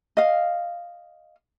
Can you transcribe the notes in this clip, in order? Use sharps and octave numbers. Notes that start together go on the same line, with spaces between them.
D#5 F5